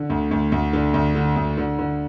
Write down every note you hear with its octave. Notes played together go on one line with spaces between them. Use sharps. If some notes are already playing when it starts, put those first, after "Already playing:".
Already playing: D3
D2
D2
D2
D3
D2
D3
D2
D3
D3